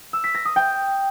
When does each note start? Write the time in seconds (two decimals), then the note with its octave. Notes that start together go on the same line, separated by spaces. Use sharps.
0.13 E6
0.24 B6
0.35 A#6
0.45 D#6
0.56 G5